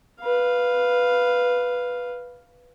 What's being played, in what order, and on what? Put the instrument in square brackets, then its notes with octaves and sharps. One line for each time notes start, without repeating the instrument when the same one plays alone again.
[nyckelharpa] B4 F5